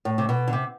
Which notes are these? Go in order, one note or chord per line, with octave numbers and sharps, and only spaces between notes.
A2
C3
B2
D3
C3